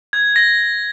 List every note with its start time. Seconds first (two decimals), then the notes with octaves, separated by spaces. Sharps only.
0.13 G#6
0.36 A#6